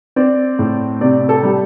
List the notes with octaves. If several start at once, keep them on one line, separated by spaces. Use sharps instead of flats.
C4 D5
A2
C3 D5
A4
G3